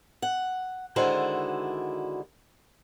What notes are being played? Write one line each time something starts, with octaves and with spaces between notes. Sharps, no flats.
F#5
D3 D#3 G#3 E4 F#4 C5